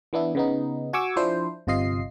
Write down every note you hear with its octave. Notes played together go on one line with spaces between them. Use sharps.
E3 B3 D4 E4
C#3 B3 D#4
F#4 G#5 C#6 D6 E6
F3 D4 E4 C5
G1 C3 F4 D#5 C7